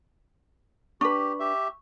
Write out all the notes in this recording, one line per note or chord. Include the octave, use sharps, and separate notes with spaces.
D4 G4 B4 C#6
G4 E5